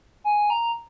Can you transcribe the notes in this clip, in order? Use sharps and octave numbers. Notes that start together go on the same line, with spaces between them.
G#5
A#5